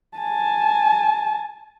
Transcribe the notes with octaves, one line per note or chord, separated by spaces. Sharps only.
G#5 A5